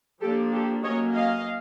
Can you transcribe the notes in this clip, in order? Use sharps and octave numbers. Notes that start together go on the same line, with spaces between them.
F3 A#3 D4 G4 A4
G4 A4
F#3 A#3 C#4 C#5 D#5
D#5 F5